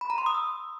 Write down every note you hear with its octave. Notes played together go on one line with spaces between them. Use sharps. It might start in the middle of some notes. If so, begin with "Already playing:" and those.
B5
A#5
C6
D#6
E6